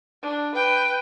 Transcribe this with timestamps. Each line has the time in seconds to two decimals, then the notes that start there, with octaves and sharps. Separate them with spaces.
0.23 D4
0.55 B4 G5